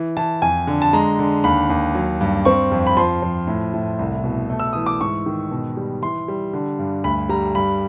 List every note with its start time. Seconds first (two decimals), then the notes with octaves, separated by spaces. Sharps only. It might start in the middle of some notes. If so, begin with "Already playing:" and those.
Already playing: E3
0.17 E3 A5
0.42 F2 G#5
0.67 D3
0.82 A5
0.93 G#3 A#5
1.19 D3
1.44 D#2 B5
1.70 D#2
1.95 F#3
2.21 G2
2.45 C4 C#6
2.72 F2
2.87 B5
2.97 F3 C6
3.22 F3
3.47 A2
3.74 A2
3.99 C2
4.24 B2
4.49 A3
4.60 E6
4.73 E3 D#6
4.86 D6
5.00 G#2 C#6
5.26 D#3
5.51 B2
5.77 G3
6.02 E3 C6
6.28 G3
6.53 D3
6.79 G2
7.04 D2 B5
7.29 G3 A#5
7.55 G2 B5